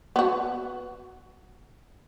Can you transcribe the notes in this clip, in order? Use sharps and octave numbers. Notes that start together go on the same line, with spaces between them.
B3 F#4